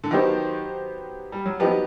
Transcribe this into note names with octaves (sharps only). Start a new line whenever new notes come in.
D3
D#3 F#3 B3 D#4 G4 C5
G3
F#3
F3 F#3 B3 D#4 G4 B4